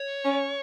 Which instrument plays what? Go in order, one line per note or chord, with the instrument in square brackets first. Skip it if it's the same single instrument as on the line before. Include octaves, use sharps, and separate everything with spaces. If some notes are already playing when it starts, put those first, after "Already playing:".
Already playing: [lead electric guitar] C#5
[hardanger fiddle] C#4